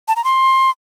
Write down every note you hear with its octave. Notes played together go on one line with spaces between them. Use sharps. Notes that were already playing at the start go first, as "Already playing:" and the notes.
A5
A#5
C6